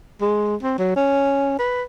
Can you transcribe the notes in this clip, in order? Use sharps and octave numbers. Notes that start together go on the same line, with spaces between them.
G#3
C4
F#3
C#4
B4